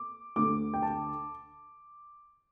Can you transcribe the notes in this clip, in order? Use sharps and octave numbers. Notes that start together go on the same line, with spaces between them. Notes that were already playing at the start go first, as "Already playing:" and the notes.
Already playing: D6
D2 D3 A3 D6
G5
A5